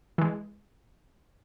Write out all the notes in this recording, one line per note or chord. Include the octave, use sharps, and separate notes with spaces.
E3 G#3